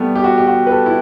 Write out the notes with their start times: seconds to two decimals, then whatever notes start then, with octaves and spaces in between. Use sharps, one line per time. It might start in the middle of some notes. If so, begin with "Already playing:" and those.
Already playing: G3 A3 B3
0.15 G4
0.24 F#4
0.38 G4
0.47 F#4
0.67 B4
0.71 A4
0.86 E4